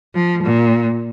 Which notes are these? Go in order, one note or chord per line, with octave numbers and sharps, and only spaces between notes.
F3
A#2